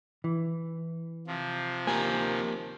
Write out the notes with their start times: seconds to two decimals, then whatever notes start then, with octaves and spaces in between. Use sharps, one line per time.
0.24 E3
1.27 C3 F3
1.87 A#3 G4 A#4 G#5